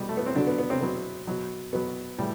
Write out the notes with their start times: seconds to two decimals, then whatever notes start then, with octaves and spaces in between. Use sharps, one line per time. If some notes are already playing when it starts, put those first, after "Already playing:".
Already playing: B2 G3
0.09 A3
0.17 B3
0.26 C4
0.35 B2 D3 F#3 D4
0.47 B3
0.58 B3
0.70 C3 C4
0.81 B2 F#3 B3
1.27 B2 F#3
1.73 B2 F#3 B3
2.18 A2 E3 G3